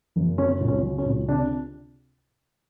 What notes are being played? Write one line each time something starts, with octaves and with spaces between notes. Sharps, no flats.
F#1
F#3 C#4
C#2
C#4
F#3
C#4
C#2
C3 D4